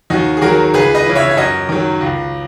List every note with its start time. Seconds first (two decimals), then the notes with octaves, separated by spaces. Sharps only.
0.10 D#2 D#4 F#4
0.37 G#4
0.42 D#3 F#3 F#4 A#4
0.74 C#2 G#4 B4
0.95 B4 D#5
1.05 C#3 E3
1.15 C#5 E5
1.31 E5
1.37 F#2 D#5 F#5
1.69 D#3 F#3
2.01 C#2